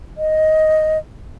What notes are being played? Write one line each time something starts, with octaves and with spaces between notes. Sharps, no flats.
D#5